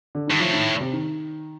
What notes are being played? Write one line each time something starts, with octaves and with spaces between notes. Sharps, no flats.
D3
G2 D#3
A2 F3
D#3
C3
D#3